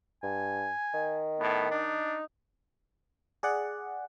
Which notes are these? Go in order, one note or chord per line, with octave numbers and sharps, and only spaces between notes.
G2 G#5
D#3
A2 B3
D4 D#4
G#4 D5 F#5